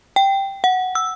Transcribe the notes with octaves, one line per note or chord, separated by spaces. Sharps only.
G5
F#5
E6